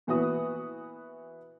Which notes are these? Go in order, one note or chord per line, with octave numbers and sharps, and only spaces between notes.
A#2 E3 B3 E4 F#4 D#6